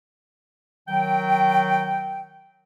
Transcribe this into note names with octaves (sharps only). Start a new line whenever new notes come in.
D#3 F#3 G5